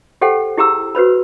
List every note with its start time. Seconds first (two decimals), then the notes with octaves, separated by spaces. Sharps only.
0.21 G4 A4 C5 F#5 G5
0.58 E4 G4 G#4 A#5 E6
0.95 F#4 B4 C5 B5